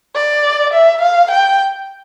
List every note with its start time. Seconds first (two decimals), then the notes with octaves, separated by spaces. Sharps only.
0.15 D5
0.73 E5
1.02 F5
1.31 G5